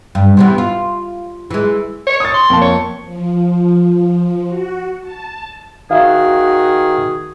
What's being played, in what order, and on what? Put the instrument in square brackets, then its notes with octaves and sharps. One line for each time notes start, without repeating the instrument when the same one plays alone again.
[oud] G2
C3 E3 B3
F4
E3 G#3
[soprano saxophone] C#5
[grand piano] D#6 A6
[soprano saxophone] C6
[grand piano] F2 A#3 A5
[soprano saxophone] C#5
[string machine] F3
F#4
A5
[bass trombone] D#3 [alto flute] F#4 [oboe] G#4 [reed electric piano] E5 F5